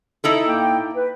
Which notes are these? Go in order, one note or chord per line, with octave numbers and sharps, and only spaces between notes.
D#4 E4 A4
A2 A#3 G5
B4